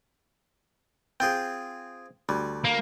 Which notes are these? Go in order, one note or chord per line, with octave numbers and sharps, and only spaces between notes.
C4 F4 G#4 G5
D2 G3
A#3